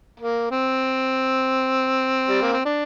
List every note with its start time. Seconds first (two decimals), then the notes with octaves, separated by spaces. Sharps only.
0.20 A#3
0.51 C4
2.28 G3
2.42 A#3
2.53 C4
2.65 D4